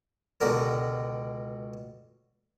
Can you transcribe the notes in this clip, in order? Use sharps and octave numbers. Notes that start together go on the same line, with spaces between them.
C#2 B2 D3 G4 A#4